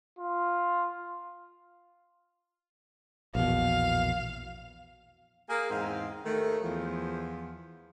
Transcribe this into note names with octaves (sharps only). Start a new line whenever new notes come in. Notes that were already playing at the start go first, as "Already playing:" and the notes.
F4
A#1 E2 B2 F5
A#3 G#4
E2 G#2 G#3 C4 F5
D#2 D#3 A3
E2 F3